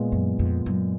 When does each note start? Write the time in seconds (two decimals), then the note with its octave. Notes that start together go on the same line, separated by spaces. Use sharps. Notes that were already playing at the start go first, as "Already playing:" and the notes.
Already playing: A#2 G#3 B3 F4
0.12 F#2
0.39 F2
0.66 F#2